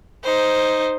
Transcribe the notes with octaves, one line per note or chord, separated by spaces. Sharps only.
D#4 C5